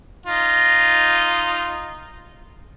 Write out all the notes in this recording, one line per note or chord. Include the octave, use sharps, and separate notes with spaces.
D#4 F4